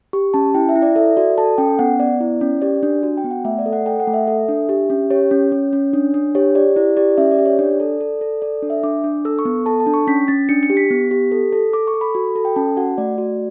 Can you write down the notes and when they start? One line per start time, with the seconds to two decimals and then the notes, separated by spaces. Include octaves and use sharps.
0.13 G4 C#6
0.34 C#4 A5
0.55 E4 G5
0.69 E5
0.76 E4
0.82 D5
0.96 A4 E5
1.17 F#4 D5
1.38 A4 A5
1.58 C#4 G5
1.79 B3 F#5
2.00 B3 D5
2.20 E4
2.41 C#4
2.62 G4 D5
2.83 D4
3.03 F#4
3.17 G5
3.24 B3
3.31 F#5
3.45 A3 E5
3.59 D5
3.66 A4
3.73 F#5
3.86 A4 G5
4.00 F#5
4.07 A3
4.14 E5
4.27 A4
4.48 D4
4.69 G4
4.90 C#4
5.10 G4 C#5
5.31 C#4
5.52 C#4
5.73 C#4
5.93 D4
6.14 D4
6.35 G4 C#5
6.55 G4 D5
6.76 E4 D5
6.97 G4 D5
7.18 C#4 E5
7.31 D5
7.38 G4
7.46 C#5
7.59 D4 D5
7.80 A4
8.01 A4
8.21 A4
8.42 A4 D5
8.63 D4
8.70 E5
8.83 D4 D6
9.04 D4
9.25 A4 E6
9.39 C#6
9.45 B3
9.66 A4 A5
9.80 A5
9.87 D4
9.94 C#6
10.08 C#4 B6
10.28 C#4 A6
10.49 D4 C#7
10.63 C#7
10.70 G4
10.77 B6
10.90 B3
11.11 G4
11.32 A4
11.53 A4
11.73 A4 D6
11.87 C#6
11.94 A4
12.01 B5
12.15 F#4
12.36 A4
12.45 G5
12.56 C#4 A5
12.77 F#4 F#5
12.98 A3 D5
13.18 F#4